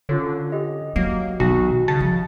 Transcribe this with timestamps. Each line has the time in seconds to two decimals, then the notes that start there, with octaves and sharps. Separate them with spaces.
0.09 D3 C#4 F4 C#5
0.52 G4 D#5
0.96 F#3 A#3
1.40 B1 D#3 F#4
1.88 C#3 A5
2.00 F3